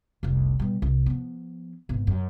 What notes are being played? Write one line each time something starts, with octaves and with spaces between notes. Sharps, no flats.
F1 C2
B2 G3
C2
F3 B3
G#1 B2
F#2